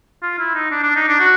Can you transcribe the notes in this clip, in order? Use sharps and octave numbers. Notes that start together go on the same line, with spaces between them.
F4
E4
D#4
D4
D4
D#4
D4
F#4